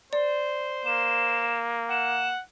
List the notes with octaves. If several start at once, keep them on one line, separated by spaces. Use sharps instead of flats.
C5 D5
A#3 E7
F#5 E7